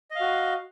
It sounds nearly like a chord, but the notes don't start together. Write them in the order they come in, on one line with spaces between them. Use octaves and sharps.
D#5 F5 F#4